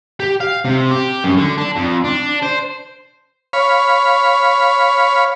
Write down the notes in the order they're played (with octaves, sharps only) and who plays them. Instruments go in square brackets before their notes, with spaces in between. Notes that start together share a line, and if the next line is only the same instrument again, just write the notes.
[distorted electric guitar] G4
F5
C3
G4
F#2
D3
D4
F2
D4
C5
[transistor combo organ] C#5 F5 B5